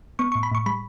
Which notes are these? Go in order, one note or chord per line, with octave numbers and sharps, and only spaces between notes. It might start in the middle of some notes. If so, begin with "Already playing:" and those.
B3 C#6
A2 C#6
B5
A2 C#6
G3 B5